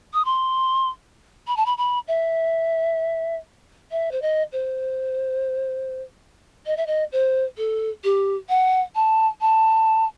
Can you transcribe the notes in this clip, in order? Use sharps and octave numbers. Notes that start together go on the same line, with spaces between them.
D#6
C6
B5
A5
B5
B5
E5
E5
C5
D#5
C5
D#5
E5
D#5
C5
A4
G4
F#5
A5
A5